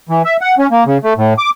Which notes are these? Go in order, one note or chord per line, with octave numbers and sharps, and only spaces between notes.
E3
E5
F#5
C#4
A#3
C#3
A3
A2
D6